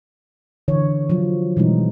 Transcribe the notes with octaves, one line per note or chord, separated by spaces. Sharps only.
D3 E3 C#5
F3 F#3 F4
B2 E3 G3 G#3 D#4